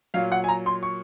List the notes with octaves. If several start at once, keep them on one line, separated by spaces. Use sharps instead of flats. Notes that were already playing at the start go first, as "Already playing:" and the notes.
A#2 F#3 F5
F#5
G#5
A#5
C6
C#6